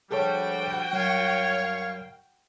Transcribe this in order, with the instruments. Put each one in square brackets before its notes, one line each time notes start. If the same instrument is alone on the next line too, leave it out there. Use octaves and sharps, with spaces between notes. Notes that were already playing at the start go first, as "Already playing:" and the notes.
[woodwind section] D2 F3 G3 [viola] F#4 G5 [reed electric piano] G#4 A4 C#5
[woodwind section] F#2 G3 F5 [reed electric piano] F#3 [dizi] C#5